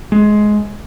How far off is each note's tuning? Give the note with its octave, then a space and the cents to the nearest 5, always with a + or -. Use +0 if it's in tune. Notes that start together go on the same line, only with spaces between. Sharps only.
G#3 +15